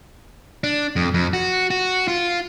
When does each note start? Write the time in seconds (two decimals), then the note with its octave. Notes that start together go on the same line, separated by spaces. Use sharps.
0.64 D4
0.96 F2
1.14 F2
1.33 F#4
1.71 F#4
2.08 F4